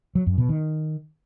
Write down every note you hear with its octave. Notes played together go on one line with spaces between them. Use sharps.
F#3
F#2
B2
D#3